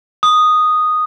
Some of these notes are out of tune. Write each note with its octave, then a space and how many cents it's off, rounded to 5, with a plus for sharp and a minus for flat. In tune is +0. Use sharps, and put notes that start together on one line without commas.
D#6 -5